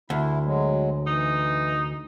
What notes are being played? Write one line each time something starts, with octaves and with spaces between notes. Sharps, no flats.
D2 E4
F#3 G#3
E3 D#4